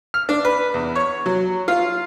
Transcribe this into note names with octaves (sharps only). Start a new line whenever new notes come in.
F6
D4
B4
E2
C#5
F#3
F4